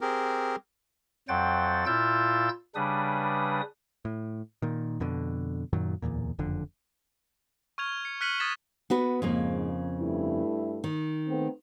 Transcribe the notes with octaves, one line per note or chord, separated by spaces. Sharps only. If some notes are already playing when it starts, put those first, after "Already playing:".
C4 G4 G#4 A#4
F2 F#3 C5 F#5 G5 A6
A#2 E4 F4 E6 G6 A6
C#3 G3 D4 B4 D#6
A2
A#2 D#3
F2 B2 D3
F#2 A#2 D#3 F#3
D1 G#1 E2 A#2
F#1 F2 D3
C#6 F6 G#6 F7
C#7
F6 F#6 B6 C#7 D#7 F#7
D#6 G#6 A6 B6 E7
B3 F#4 B4
F2 G#2 C#3 A#3
G2 A3 E4
D#3
A3 B3 C4